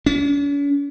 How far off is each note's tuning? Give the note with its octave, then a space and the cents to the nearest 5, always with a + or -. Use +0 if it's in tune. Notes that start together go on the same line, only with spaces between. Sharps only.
C#4 +45